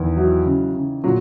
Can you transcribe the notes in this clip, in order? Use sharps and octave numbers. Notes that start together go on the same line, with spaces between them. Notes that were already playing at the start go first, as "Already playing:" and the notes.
Already playing: E2 D#3 E3
E3 F#3
C#3
C#3
A#2 F#3